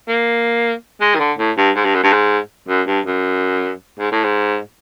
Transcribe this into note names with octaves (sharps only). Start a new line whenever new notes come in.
A#3
G#3
D#3
D3
A2
G2
G#2
G2
F#2
G2
G#2
F#2
G2
F#2
G#2
A2
G#2